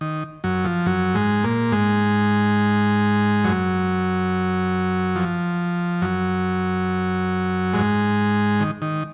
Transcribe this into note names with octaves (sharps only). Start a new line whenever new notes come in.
D#3
F#2 F#3
F3
F#2 F#3
G#2 G#3
A#2 A#3
G#2 G#3
F#2 F#3
F3
F#2 F#3
G#2 G#3
D#3
D#3